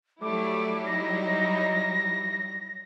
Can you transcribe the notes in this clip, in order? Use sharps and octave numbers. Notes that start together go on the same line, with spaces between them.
F#3 G3 A3 E4 D6
D#4 A#6